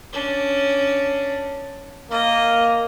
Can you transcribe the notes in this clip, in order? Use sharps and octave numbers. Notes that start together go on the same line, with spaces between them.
C#4 D4
A#3 D#5